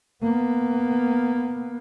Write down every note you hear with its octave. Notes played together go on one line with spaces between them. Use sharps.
A#3 B3